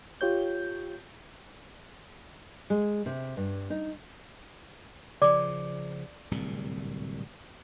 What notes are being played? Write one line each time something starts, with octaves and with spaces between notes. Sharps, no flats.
F4 G4 C#5 G6
G#3
C3
G2
D#4
C#3 F3 D5 D6
D1 C2 A#2